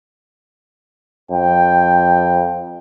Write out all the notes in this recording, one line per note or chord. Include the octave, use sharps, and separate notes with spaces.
F2 G5